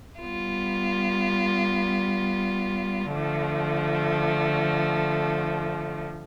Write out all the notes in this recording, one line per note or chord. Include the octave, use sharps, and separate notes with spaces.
G3 B3 F4
D3 F3 A3